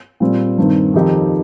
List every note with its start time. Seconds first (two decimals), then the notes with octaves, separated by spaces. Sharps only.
0.20 A#2 G3 C4
0.58 G2 D#3 C4
0.94 F2 D#3 C4 D#4 G4